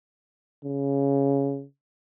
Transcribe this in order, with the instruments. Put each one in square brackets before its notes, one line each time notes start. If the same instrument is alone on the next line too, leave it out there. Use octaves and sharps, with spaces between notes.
[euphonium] C#3